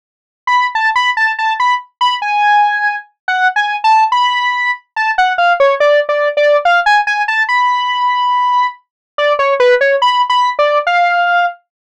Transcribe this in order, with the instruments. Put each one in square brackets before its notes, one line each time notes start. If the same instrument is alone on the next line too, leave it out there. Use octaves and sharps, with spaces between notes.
[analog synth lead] B5
A5
B5
A5
A5
B5
B5
G#5
F#5
G#5
A5
B5
A5
F#5
F5
C#5
D5
D5
D5
F5
G#5
G#5
A5
B5
D5
C#5
B4
C#5
B5
B5
D5
F5